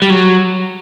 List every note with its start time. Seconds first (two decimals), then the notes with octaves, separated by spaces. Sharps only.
0.02 G3
0.10 F#3